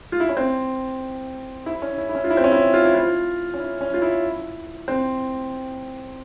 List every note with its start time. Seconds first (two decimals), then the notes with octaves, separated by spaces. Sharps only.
0.12 F4
0.20 E4
0.29 C#4
0.37 C4
1.66 E4
1.82 C#4
1.98 E4
2.09 E4
2.15 C#4
2.24 F4
2.30 E4
2.37 C4
2.44 C#4
2.52 E4
2.74 F4
2.85 E4
2.95 F4
3.54 C#4
3.60 E4
3.81 C#4
3.94 F4
4.02 E4
4.88 C4